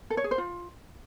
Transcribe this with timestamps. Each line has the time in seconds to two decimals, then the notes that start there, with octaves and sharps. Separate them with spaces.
0.10 A4
0.17 C#5
0.24 G#4
0.31 C5
0.38 F4